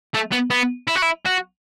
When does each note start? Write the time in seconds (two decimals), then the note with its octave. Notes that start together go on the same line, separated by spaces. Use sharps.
0.14 A3
0.32 B3
0.50 B3
0.88 E4
0.95 F#4
1.02 E4
1.26 F#4